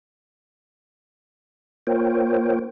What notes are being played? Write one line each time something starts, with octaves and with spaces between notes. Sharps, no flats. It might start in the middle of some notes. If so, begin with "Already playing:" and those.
A#3 F4 A#4 C5 C#5 G5